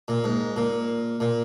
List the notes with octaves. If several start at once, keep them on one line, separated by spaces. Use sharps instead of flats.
A#2
G#2
A#2
A#2